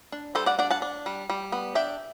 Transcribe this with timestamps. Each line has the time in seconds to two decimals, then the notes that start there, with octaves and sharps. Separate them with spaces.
0.12 D4
0.35 G3 A4 C5
0.46 D5 F#5
0.59 D4 D5 F#5
0.71 F#5 A5
0.82 D4
1.06 G3
1.30 G3
1.52 B3
1.75 D4 E5 G5